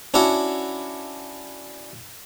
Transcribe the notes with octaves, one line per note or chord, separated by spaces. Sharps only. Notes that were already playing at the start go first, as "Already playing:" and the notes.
C#4 D4 E4 F#4 F#5